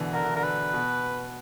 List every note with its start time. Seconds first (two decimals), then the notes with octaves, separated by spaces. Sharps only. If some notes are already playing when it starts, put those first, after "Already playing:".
Already playing: B2 D3 E3
0.14 D3 A#4
0.25 E3
0.36 D3 A#4
0.44 B4
0.73 B2